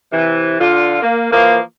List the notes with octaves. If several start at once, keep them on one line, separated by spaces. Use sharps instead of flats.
C3 E3
D3 F4
A#3
E3 F3 A#3